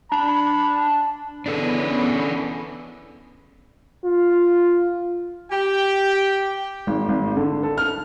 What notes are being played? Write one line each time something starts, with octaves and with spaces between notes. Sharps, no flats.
D4 A5 B5
E3 B3 C#4 D4 G#4 A4
F4
G4 G5
G#1
G#1
D3
A4
F6